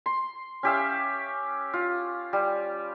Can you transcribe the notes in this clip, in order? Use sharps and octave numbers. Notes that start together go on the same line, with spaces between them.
C6
C#4 G4 E5 F5
F4
G3